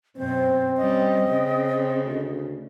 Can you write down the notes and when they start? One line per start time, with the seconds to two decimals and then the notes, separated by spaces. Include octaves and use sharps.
0.17 F#2 B2 C4 C5
0.77 G3 C#4 D#5
1.29 C#3
2.05 D2